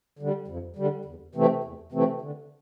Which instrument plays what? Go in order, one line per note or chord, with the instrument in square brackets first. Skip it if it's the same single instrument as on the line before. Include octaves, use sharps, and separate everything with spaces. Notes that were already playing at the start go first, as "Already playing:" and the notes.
[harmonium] D3 G3
F2
D3 G3
E2
C3 E3 A3 C4
E2
C3 E3 A3 C4
D3